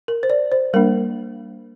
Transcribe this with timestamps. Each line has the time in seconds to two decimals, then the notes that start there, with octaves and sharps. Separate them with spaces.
0.08 A#4
0.23 C5
0.30 D5
0.52 C5
0.73 G3 A#3 D4 A#4